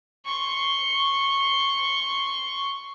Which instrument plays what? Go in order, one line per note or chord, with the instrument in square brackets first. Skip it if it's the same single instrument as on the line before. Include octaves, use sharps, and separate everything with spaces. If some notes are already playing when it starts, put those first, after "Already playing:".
[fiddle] C6 C#6